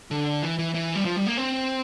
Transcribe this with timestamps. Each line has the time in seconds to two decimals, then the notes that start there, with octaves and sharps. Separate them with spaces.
0.11 D3
0.43 E3
0.59 E3
0.74 E3
0.95 G3
1.05 F3
1.16 G3
1.27 A#3
1.37 C4